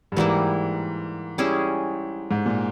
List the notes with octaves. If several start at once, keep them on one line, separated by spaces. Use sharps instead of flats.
G2
G#2 E3 G3 A#3 E4
G3 C#4 E4 G#4
G#2
A#2